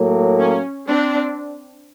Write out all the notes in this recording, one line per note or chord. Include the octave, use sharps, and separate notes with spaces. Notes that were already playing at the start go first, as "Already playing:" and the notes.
Already playing: A2 F#3 A#3
C#4
C4 D4